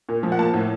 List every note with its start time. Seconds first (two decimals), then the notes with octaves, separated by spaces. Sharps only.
0.09 A#2
0.23 F3
0.32 F#5
0.39 A#3 A5
0.54 A2